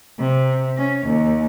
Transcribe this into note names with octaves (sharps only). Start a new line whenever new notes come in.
C3
C#4
D#2